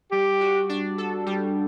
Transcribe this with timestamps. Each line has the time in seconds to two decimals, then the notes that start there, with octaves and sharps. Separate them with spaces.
0.12 G3 G4
0.41 F#4
0.69 D4
0.98 A4
1.26 G3